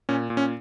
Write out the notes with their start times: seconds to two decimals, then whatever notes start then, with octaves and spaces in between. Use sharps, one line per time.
0.09 A#2 C#4
0.30 A#2
0.37 C#4